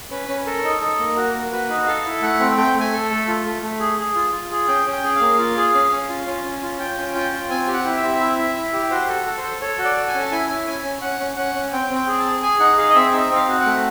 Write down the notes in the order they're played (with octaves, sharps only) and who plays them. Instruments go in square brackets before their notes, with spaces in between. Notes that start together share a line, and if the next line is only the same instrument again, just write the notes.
[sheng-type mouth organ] C#4 B4
C#4
A4 A#4
D#4
D#4 A4
A#3
F#4 A#4
A#3
F#4 B4
D#4
A4 F5
E4
A3 F#5
C4
A3 G5
A3
G#5
A4
A3
F4
A3
A3
G#4
G#4
F4
F4
G#4
C#4 G5
C#4
G5
G#4
F5
A#3
F4
G#4
C#4
C#4
F4
C#4
C#4
F4
F4 G5
C#4
F4 G5
F4
C4 G#5
G4
F#5
E4
E5
C4
E4
E4
E4
G4
F#4 C5
A4
A4
C5
A4
A4 C#5
F#4
D5
A4
G#5
C#4
A5
E4 G#5
E4
C#4 G#5
C#4
C#4 F#5
C#4
C#4 F#5
C#4
C4 G5
C4
G5
G#4
A5
G#4
G#4 G#5
D#4 F#5
G#4 F5
D#5
C4 E5
D#4 E5
C4 F5
F#4
F#5
A3